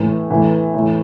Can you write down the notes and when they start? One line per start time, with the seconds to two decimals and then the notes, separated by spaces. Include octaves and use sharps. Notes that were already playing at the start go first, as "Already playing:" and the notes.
Already playing: A2 E3
0.31 A2 E3
0.74 A2 E3